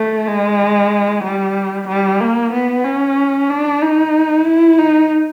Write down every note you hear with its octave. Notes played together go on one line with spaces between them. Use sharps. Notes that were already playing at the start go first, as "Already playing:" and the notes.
Already playing: A3
G#3
G3
G3
A#3
B3
C#4
D4
D#4
E4
D#4